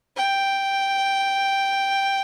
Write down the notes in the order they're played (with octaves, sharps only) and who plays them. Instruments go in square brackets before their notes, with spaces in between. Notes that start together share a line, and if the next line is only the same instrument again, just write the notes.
[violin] G5